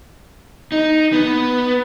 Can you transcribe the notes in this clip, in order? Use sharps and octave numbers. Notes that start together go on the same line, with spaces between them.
D#4
B3